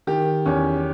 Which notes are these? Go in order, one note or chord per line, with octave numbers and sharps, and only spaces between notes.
D#3 G4
E2 C#4